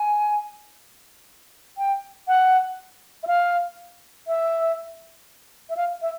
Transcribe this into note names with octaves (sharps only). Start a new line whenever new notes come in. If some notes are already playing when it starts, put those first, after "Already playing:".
Already playing: G#5
G5
F#5
E5
F5
E5
E5
F5
E5